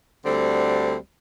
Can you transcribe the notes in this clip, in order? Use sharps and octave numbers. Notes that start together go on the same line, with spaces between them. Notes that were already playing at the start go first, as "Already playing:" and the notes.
D2 D3 G3 C4